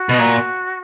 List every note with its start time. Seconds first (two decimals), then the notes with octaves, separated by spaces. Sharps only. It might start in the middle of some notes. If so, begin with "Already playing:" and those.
Already playing: F#4
0.09 B2
0.18 A#2